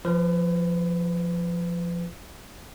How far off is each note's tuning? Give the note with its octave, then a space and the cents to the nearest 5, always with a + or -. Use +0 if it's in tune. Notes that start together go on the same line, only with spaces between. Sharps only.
F3 +0 B4 +30